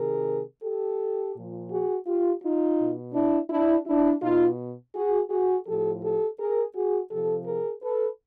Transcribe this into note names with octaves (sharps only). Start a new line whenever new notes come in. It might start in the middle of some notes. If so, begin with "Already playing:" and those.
Already playing: C3 D#3 G#4 A#4
G4 A4
A#2 F3
F#4 G#4
F4 G4
D#4 F4
B2
D4 E4
D4 E4
D4 E4
B2 D#4 F4
F#4 G#4
F#4 G#4
A2 F3 G4 A4
G4 A4
G#4 A#4
F#4 G#4
C3 F3 G4 A4
G#4 A#4
A4 B4